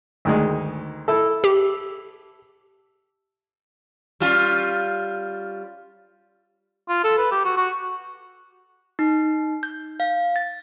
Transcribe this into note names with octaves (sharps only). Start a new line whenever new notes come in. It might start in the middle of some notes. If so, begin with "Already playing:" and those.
D2 D#3 G#3
E4 A4
G4
G3 C#4 F4
F4
A4
B4
G4
F#4
F#4
D#4
G6
F5
A6